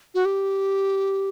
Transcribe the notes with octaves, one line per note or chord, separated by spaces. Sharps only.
F#4
G4